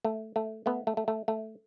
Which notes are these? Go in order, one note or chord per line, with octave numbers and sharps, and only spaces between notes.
A3
A3
A3 B3
A3
A3
A3
A3